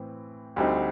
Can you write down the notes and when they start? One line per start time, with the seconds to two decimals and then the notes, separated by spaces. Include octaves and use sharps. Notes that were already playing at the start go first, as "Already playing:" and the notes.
Already playing: A2 E3 C4
0.56 D2 D3 G3 C4 D#4